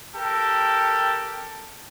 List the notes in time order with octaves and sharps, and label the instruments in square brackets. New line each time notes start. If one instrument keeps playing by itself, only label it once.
[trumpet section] G4 A4 A#4